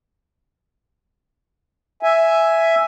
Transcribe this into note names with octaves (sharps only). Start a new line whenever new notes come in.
E5 G#5